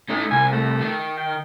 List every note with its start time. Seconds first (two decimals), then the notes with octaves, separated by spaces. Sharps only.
0.09 A3 C#4 D#4
0.31 C2 G#5
0.53 A3
0.81 D#3
1.17 G5